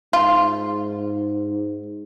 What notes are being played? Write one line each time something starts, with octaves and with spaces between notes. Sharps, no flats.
G#2 F4